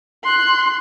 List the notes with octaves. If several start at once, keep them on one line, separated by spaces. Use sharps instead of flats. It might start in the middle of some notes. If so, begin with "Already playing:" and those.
C6 F#6